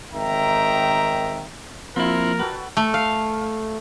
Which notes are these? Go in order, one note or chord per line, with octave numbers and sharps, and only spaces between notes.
G#1 D#3 E5 G5 A#5
F3 A#3 C4 E4 F4 A#4
F#4 A4 B4 G5
A3
F5